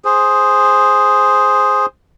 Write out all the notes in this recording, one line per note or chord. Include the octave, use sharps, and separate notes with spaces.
G#4 C5